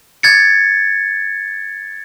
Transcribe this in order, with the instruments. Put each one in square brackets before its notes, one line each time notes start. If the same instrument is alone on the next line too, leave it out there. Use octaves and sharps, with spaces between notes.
[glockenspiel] G#6 A6 C#7